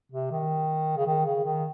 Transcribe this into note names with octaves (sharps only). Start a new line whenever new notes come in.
C3
D#3
C#3
D#3
C#3
D#3